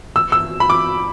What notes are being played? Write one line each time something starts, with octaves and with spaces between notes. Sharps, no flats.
E6
E6
B5
D6